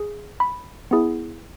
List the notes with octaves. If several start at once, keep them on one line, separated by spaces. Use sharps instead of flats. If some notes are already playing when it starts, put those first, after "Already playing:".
Already playing: G#4
B5
B3 E4 G#4